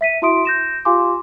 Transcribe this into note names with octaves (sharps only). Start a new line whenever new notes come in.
E5 B6 D#7
E4 F#4 E5 C6 D#6 D7
G6 A#6 E7
F4 G4 F5 G#5 C6 D6